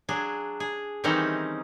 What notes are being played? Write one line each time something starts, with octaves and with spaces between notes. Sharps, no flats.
F#3 D4 G#4
G#4
D#3 E3 G3 C4 C#4 D#4